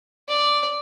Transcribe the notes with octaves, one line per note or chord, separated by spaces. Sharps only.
D5